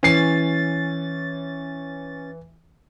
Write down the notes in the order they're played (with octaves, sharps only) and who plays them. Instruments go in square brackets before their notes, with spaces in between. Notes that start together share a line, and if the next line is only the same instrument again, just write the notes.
[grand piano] E3 C7 [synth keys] C#4 A6